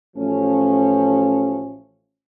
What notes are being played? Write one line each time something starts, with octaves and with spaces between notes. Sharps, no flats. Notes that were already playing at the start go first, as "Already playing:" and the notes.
A1 F3 A3 C#4